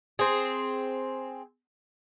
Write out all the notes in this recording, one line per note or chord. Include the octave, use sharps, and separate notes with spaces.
C4 G#4